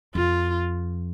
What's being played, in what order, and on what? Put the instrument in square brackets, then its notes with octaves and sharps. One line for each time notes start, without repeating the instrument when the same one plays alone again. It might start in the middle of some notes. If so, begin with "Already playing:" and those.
[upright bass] F2 [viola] F4